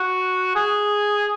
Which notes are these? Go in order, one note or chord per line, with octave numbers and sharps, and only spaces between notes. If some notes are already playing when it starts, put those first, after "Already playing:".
Already playing: F#4
G#4